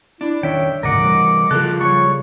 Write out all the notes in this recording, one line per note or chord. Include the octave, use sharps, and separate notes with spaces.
D4 E4
D#3 C#4 C#5 E5 G5
D2 G#2 C#3 A#4 D#5 F#5 D6
E3 G3
C#3 F3 A#3 A4 F#6
G3 C#5 C#6